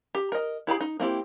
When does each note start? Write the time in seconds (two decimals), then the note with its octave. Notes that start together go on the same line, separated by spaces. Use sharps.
0.15 G4
0.32 A#4 D#5
0.67 E4 G4 G#4 B5
0.81 D#4
1.00 A#3 C4 E4 G4